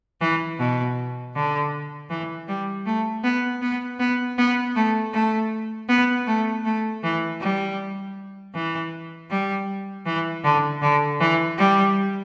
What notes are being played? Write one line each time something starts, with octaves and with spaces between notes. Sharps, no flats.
E3
B2
D3
E3
G3
A3
B3
B3
B3
B3
A3
A3
B3
A3
A3
E3
G3
E3
G3
E3
D3
D3
E3
G3